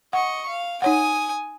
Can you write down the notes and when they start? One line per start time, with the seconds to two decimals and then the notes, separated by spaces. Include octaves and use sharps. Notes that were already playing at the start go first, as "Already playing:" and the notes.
0.13 D#5 F#5 C#6
0.47 F5
0.82 D#4 C#5 F#5 G#5 D#6